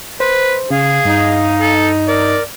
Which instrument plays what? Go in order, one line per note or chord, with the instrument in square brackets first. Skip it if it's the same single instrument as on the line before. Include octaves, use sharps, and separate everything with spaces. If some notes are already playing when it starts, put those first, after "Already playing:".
[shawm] B4 [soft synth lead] C5
[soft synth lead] C#3 [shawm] G#4 [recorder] F5
[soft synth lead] G2 [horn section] D#4
[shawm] A4
[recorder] A#4 [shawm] D5